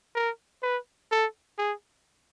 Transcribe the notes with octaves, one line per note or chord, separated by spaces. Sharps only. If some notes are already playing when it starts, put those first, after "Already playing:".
A#4
B4
A4
G#4